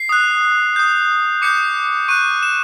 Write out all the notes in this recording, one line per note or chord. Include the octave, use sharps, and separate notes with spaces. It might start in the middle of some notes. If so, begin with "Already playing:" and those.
Already playing: C7
D#6 F#6
D#6 G6
D6 G6 C#7
C#6 F#6 D#7
E7